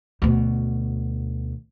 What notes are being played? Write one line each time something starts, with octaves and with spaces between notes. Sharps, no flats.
D2 B2